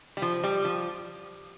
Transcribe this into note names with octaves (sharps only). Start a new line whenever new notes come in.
G3
F3
G3
F3